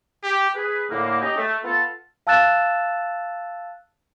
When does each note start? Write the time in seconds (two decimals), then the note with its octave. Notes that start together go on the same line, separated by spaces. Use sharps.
0.23 G4
0.55 G#4 B4
0.90 A2 D3 A#3
1.20 C#4 D#4 G4 D#5
1.36 A3
1.64 B3 F4 A4 A5
2.27 F5 A5 E6 F#6 A6 E7